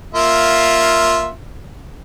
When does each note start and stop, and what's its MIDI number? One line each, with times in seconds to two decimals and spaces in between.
0.15 1.30 58
0.15 1.30 65
0.15 1.30 76